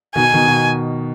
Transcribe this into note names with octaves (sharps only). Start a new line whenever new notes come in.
B2 D#3 G#5
B2 D#3
B2